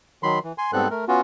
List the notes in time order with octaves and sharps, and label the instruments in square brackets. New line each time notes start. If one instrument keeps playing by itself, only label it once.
[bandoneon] D#3 F#3 B5 C6
E3
G#5 C6
G#2 G3 B3 C4 A4 F#6
A3 A#4
B3 C#4 F4 F#4